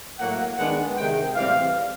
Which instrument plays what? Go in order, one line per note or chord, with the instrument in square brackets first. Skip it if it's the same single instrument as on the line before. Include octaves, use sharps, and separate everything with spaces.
[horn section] A2 F#3 A#3 F#5
D#3 G#3 B3 D4 F#5
C3 D#3 G#3 G5
A2 E3 G3 C4 F5